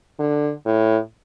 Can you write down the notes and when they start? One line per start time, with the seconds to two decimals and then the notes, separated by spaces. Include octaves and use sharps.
0.19 D3
0.65 A2